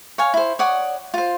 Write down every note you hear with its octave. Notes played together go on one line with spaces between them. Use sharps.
C#5 F5 G#5
E4 C5
C#5 D5 F#5 D#6
F4 C5